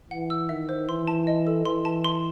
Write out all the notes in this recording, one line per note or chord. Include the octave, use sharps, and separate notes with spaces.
E3 F#5
E6
D#3 E5
C5
E3 C6
A5
D#5
A4
E3 C6
A5
C6